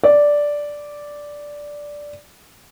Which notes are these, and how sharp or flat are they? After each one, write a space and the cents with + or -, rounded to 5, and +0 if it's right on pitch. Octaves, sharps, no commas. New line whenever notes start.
D5 -5